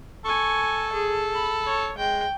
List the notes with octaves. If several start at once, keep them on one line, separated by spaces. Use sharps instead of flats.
A4 G#5 C#6
G#4
B5
C#5
G#3 G5